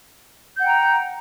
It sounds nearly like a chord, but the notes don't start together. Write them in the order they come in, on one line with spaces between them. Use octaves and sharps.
G6 F#5 G5 A#5